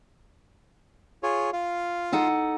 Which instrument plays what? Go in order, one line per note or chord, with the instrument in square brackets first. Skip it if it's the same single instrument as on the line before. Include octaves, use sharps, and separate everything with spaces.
[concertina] F4 G#4 C#5
F4 F5
[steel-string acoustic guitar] D#4 A4 F#5